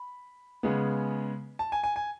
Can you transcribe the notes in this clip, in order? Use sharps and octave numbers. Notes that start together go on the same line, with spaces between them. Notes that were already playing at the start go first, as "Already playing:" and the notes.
Already playing: B5
C#3 G#3 B3
A5
G#5
G#5
G#5